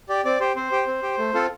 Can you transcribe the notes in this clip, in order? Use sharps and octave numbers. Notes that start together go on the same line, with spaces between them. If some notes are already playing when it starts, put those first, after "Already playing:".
G4 D5
C4 D5
G4 C5
C4 C5
G4
C4
G4
A3
C4 F4 A4